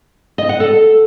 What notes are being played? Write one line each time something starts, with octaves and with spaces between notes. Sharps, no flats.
D#5
F#5
A4